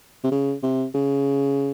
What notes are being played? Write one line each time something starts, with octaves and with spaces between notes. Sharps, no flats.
C3
C#3
C3
C#3